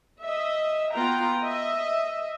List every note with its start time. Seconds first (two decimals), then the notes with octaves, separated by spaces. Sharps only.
0.23 D#5 E5
0.94 B3 F4 G5 A#5
1.42 D#5 E5